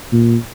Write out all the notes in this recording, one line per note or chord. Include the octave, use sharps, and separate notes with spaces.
A#2